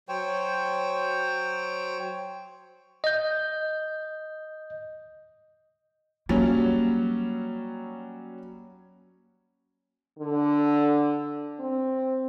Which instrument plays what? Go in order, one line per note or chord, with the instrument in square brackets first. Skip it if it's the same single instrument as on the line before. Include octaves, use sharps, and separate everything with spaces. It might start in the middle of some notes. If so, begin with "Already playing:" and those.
[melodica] F#3 C5 C#5 G5
[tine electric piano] D#5 G6
[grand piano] F#3 G3 C#4 [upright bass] A#3
[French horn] D3
C4